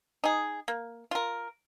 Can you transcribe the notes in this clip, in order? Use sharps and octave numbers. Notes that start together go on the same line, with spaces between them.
D#4 G#4
A#3
F4 A#4